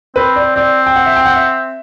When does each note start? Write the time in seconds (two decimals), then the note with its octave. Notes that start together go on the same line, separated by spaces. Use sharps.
0.16 C4 B4
0.36 D5
0.56 C4 D5
0.86 G5
0.96 F#5
1.06 E5
1.16 G5
1.26 F#5
1.36 E5